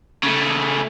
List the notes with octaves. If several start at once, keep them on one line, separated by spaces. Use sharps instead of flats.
C#3 A3